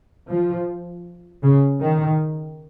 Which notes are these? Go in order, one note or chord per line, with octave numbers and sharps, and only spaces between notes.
F3
C#3
D#3